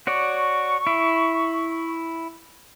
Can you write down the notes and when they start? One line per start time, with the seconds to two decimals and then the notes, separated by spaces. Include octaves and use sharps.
0.07 F#4 C#5 D5 C#6
0.87 E4